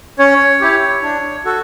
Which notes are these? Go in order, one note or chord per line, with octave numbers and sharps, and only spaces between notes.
C#4 C#5
E4 G4
D4
F#4 A4